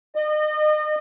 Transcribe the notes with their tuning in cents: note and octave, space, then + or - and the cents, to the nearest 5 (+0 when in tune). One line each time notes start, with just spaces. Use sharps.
D#5 -35